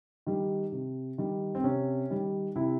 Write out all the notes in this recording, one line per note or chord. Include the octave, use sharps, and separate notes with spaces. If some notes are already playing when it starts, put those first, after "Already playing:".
D#3 G3
C3
D#3 G3
C4
C3 C#4
D#3 G3
C3 E4